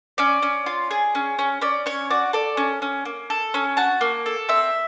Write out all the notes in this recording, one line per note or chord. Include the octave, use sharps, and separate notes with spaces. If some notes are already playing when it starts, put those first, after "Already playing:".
C#4 D5
C#4
F4
G#4
C#4
C#4
C#4 D5
C#4 C#5
F#4 D5
A4 D5
C#4
C#4
A#3
A4
C#4
F#4 A5
A#3
A4
C4 E5